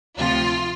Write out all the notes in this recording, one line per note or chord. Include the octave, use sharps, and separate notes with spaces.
D2 C3 F3 F4